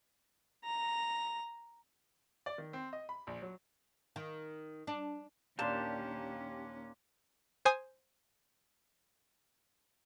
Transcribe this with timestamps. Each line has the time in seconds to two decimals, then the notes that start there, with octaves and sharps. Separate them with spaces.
0.65 A#5
2.46 D5
2.58 D#3
2.73 C4
2.93 D#5
3.09 B5
3.27 A#1
3.42 F#3
4.16 D#3
4.87 D4
5.59 D#2 A#2 A#3 C#4 D4 G4 A5 C6
7.65 C5 G#5 D#6